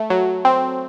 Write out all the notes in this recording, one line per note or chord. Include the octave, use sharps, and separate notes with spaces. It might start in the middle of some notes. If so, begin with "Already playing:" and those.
Already playing: A3
F#3
C4